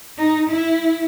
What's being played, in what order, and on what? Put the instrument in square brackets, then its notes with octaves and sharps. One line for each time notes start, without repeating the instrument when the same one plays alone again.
[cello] D#4
E4